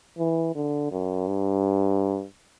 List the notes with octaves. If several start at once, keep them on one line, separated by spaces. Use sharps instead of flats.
E3
D3
F#2
G2